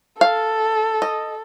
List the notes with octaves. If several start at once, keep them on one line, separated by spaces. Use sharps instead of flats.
A4 F5
D#5